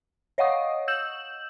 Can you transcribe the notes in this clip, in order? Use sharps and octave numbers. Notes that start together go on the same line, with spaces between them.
C#5 D#5 F5 F#5 C#6 D#6
E6 G6 E7 F#7